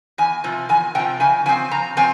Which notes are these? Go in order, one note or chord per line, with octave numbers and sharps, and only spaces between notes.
E2 G#5
C3 F3
E2 G#5
C3 F3 G5
C#3 G#5
F3 C4 G#5
C#3 A#5
F3 C4 G#5